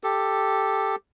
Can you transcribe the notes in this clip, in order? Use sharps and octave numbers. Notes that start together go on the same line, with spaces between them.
G4 A4